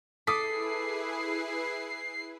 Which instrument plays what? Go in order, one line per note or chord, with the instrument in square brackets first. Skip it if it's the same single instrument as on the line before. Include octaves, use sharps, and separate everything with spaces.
[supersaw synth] E4 G#4 B4 [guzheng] A4 [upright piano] D6 D#6 B6 [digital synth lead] C7